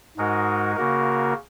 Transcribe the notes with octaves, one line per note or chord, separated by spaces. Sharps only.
G#2 G#3 D#4 F#4 A#4
C#3 A#3 F#4 A#4